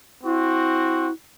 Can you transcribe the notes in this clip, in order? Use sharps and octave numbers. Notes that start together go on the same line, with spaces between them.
C4 E4 F#4